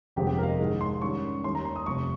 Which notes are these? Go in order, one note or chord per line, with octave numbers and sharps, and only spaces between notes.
G1 F2 C3 F3 G#3 G4
G4
A#4 F5
D#5
G#2 D#3 G#3
C6
G#2 D#3 G3 C#4 C#6
D#2 D#3 G3 C6
A#5
C6
D#6
F1 F2 C3 C#6